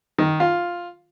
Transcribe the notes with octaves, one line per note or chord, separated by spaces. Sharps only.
D#3
F4